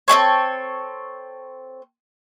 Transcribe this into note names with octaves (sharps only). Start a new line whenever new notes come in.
C4 D4 A4 C#5